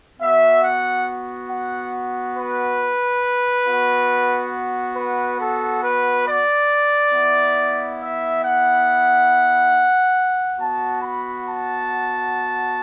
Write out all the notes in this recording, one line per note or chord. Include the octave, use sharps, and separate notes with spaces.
B3 F#4 E5
F#5
F#5
B4
B3 F#4
B4
A4
B4
D5
B3 E4
E5
F#5
B3 F#4 A5
B5
A5